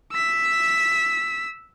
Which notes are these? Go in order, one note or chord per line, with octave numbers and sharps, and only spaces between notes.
E6 B6